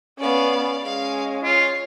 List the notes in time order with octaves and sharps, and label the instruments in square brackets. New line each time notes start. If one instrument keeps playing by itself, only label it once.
[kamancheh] B3 C#4 [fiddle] D5 F5
[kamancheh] G#3 C#4 [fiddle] F5
[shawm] F4 [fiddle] C#5